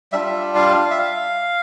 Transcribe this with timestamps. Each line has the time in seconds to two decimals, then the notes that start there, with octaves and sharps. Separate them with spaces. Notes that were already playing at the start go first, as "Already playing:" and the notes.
0.12 G3 D4 F4 E5
0.55 F5
0.91 E5
0.98 F5